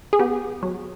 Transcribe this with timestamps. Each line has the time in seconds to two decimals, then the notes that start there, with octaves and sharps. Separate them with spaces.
0.13 G#4
0.19 B3 G4
0.63 F#3